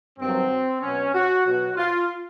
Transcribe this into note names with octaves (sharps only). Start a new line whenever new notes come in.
G2 D#3 F#3 C4
B2 F#3 C#4
F#4
B2 F#3 F#4
F4